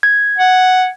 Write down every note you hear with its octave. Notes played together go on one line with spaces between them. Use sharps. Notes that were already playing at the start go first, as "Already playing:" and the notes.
G#6
F#5